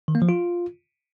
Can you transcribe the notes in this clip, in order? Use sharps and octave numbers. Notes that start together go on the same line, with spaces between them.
D#3
A#3
F3
F4